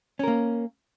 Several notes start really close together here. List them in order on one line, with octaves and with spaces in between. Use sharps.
C#4 A#4 A#3